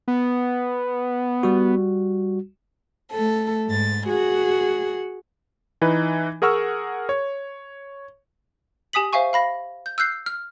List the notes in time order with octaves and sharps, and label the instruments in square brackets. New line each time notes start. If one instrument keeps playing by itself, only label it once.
[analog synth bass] B3
[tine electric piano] G3 F#4
[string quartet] A3 A4
G#2 A6
F#4 G#4
[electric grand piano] E3 D#4 B4
G#4 A#4 F#5 C#6 E6 F6
C#5
[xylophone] G4 G#5 D#6 B6 F#7
C5 E5 F5 G#5 C#6
F5 B5 A#6
G6
E6 F#6 G6 C7
F6